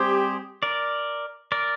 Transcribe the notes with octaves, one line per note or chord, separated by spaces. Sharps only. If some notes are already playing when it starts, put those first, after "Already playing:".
Already playing: G3 C4 G4 G#4 C5
A#4 D5
A#4 D5